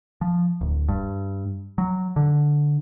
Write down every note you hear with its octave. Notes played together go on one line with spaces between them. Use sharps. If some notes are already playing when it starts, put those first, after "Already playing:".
F3
D1
G2
F#3
D3